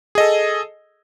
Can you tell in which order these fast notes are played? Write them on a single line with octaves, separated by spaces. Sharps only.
G#4 D#5 A4